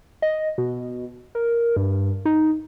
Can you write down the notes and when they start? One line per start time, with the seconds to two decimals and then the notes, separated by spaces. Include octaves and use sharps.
0.22 D#5
0.58 B2
1.35 A#4
1.76 G2
2.25 D#4